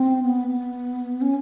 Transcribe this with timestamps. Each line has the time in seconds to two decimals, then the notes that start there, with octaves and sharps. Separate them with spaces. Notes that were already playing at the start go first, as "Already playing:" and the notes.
Already playing: C4
0.23 B3
0.48 B3
1.21 C#4